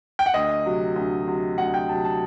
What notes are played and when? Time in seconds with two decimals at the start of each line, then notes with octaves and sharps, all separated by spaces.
0.19 G5
0.26 F#5
0.34 D2 D#5
0.65 C3 F#3
0.96 D2
1.27 C3 F#3
1.58 D2 F#5
1.74 G5
1.89 C3 F#3 A5
2.05 A5